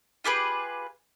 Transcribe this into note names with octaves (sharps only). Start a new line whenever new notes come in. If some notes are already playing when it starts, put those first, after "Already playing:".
F4 G4 G#4 B4